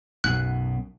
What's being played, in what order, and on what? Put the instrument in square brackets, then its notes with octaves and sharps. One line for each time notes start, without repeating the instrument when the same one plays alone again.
[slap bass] B1 F#2 B2 [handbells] F#6